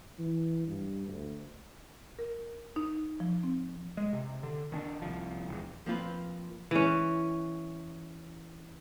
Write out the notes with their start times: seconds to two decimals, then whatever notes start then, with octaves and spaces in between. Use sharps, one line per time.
0.19 E3
0.67 G2
1.08 D2
2.19 A#4
2.76 D#4
3.20 F3
3.43 C4
3.97 G#3
4.13 C3
4.43 D3
4.72 D#3 C#4 D4
5.02 C2 F3
5.49 E1 E2
5.86 F3 A#3 C4 F4 B4
6.71 E3 C#4